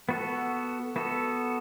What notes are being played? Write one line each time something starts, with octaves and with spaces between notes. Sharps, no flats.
B3 F#4 A4
B3 F#4 A4